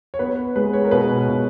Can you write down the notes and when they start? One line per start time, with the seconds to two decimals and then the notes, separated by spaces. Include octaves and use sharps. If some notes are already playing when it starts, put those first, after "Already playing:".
0.14 C#5
0.19 B3 B4
0.56 G#3 B4
0.73 C#5
0.84 A#4
0.91 B2 B4
1.29 B2